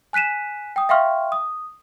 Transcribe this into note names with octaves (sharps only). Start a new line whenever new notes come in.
G#5 F#6 B6 D#7 E7
G5 D#6
E5 F5 G5 C6 C#6 F6
D#6